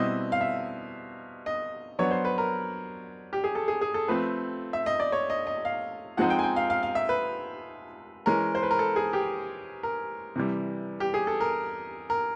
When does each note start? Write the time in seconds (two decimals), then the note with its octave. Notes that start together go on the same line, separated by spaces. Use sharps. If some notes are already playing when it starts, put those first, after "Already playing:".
Already playing: B2 G3 C4 E4 D#5
0.32 F5
0.41 E5
1.46 D#5
1.99 F#3 B3 D4 C#5
2.11 C5
2.25 B4
2.38 A#4
3.33 G4
3.44 G#4
3.55 A4
3.68 G#4
3.81 G#4
3.94 A4
4.08 F3 A3 C4 B4
4.73 E5
4.86 D#5
5.00 D5
5.12 C#5
5.30 D#5
5.47 D#5
5.65 F5
6.17 F3 G#3 C4 D#4 F#5
6.30 G5
6.39 G#5
6.43 G5
6.56 F5
6.70 F5
6.83 F5
6.95 E5
7.09 B4
8.26 E3 G#3 C#4 A#4
8.55 C5
8.63 B4
8.71 A#4
8.79 A4
8.96 G#4
9.13 G4
9.83 A#4
10.36 C3 E3 G3
11.00 G4
11.14 G#4
11.27 A4
11.41 A#4
12.10 A#4